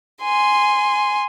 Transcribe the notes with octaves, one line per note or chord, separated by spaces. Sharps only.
G#5 C6